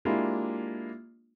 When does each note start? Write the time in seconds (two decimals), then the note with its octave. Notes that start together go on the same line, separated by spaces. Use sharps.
0.05 G#3 A#3 D4 E4 F4 G4